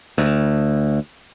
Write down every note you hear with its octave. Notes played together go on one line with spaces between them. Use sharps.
D2